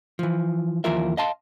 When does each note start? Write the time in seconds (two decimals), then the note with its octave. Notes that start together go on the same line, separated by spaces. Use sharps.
0.19 E3 F3
0.84 D#2 E3 F3 F4 A#4 E5
1.17 D#5 F5 A5 C6